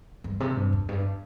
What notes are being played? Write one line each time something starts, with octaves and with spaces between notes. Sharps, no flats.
G2
C3
G2
E2
G2